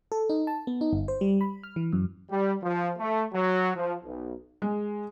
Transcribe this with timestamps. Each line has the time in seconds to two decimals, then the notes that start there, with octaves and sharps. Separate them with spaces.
0.12 A4
0.30 D#4
0.47 A5
0.67 B3
0.81 D#4
0.93 G1
1.08 C5
1.21 G3
1.41 B5
1.63 F6
1.76 E3
1.93 F#2
2.31 G3
2.63 F3
2.99 A3
3.34 F#3
3.76 F3
4.05 B1
4.62 G#3